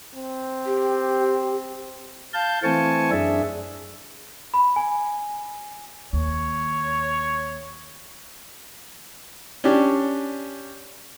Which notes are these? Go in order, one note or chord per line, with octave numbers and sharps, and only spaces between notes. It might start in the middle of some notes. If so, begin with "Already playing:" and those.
C4
G4
F5 A5 G6
E3 A3 C4 G#5 A5 C#6
F#2 D4 G#4 E5
B5
G#5
D#2 C#5
C#4 D4 G4